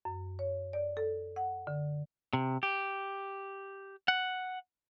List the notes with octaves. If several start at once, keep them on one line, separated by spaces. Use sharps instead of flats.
F#2
C#5
D5
A4
F#5
D3
C3
G4
F#5